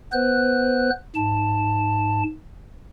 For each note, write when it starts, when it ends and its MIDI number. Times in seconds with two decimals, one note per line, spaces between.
0.13 0.90 59
0.13 0.90 71
0.13 0.90 72
0.13 0.90 90
1.15 2.23 44
1.15 2.23 81